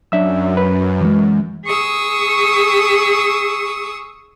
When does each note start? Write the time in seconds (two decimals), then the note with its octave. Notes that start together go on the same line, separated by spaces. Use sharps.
0.12 F#2 F#3 D4 E5 E6
0.57 B4
1.01 E3 G#3
1.65 G#4 C#6 D#6 E6